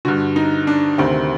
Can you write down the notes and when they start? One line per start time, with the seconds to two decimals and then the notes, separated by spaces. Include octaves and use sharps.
0.05 G2 D3 F#4
0.36 D#4
0.67 D4
0.98 D2 C3 D#3 C4